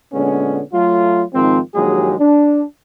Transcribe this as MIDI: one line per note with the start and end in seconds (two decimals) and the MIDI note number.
0.13 0.61 46
0.13 0.61 50
0.13 0.61 56
0.13 0.61 59
0.13 0.61 61
0.73 1.22 54
0.73 1.22 57
0.73 1.22 65
1.33 1.59 44
1.33 1.59 51
1.33 1.59 53
1.33 1.59 60
1.74 2.13 34
1.74 2.13 39
1.74 2.13 54
1.74 2.13 56
1.74 2.13 67
1.74 2.13 68
2.19 2.62 62